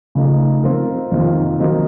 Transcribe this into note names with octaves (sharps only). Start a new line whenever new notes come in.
C#3 F3 A3 D#4
F3 C4 F4 A#4
F2 C3 D#3 A#3 F4
D#3 F#3 C4 D#4 A#4